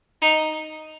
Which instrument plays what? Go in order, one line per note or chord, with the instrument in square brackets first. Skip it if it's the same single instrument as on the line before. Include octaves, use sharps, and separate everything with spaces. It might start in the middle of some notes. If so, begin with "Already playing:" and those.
[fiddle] D#4